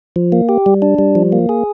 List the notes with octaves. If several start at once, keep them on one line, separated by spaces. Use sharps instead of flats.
F3
A#3
G4
G3
D4
G3
F3
A#3
G#4